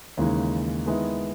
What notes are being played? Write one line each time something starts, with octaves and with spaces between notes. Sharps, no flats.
D#2 C#3 E3 G#3 D#4
D#3 G#3 B3 E4